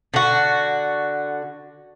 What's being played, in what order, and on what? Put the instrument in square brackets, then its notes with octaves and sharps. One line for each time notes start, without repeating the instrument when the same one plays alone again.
[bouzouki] D3 F#4